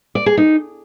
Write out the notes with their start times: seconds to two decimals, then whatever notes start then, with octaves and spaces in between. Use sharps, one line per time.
0.15 D5
0.26 G#4
0.37 D#4